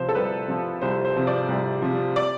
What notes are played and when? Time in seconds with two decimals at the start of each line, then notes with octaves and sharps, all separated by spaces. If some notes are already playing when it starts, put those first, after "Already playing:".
Already playing: C2 C3 F3 C5
0.09 A4
0.15 C2 B4
0.48 C3 F3
0.82 C2 C5
1.05 C5
1.16 C3 F3
1.27 D5
1.48 C2
1.82 C3 F3
2.16 D5